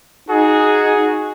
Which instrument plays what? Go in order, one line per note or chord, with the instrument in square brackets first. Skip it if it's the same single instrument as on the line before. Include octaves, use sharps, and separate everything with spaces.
[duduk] D#4 [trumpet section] F#4 G#4